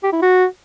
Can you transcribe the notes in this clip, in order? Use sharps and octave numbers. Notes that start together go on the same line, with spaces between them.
G4
E4
F#4